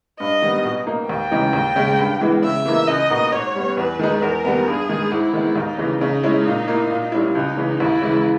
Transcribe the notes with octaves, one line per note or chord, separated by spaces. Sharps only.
G2 D#5
D#3 G3 B3
B2
A#3 D#4
D#2 G5
C#3 E3 G#3 D#4
D#2
C#3 G#3
G2
E3 G#3 B3 E4
C#3 E5
E3 A#3 D#4
C#2 D#5
B2 A#3 D#4
G#2 C#5
G3 B3
E2 B4
D#3 G#3 D#4
E2 A#4
D#3 G3 B3
G2 G#4
D#3 G#3
G#2 E4
D#3 G#3 B3
D#2 D#4
C#3 E3
C#3 D#4
G#3 C#4 E4
A#2
A#3 E4
A#2
G3 C#4 E4
C#2 D#4
C#3 E3
D#2 E4
C#3 E3 G#3